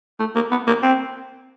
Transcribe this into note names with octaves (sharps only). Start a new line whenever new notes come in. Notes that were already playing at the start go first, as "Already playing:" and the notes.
A3
A#3
B3
A#3
C4